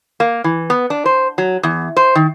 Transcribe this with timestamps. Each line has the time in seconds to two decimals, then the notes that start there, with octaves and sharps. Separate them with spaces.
0.20 A#3
0.44 E3
0.70 B3
0.90 D4
1.05 C5
1.38 F#3
1.63 E2
1.96 C5
2.15 D#3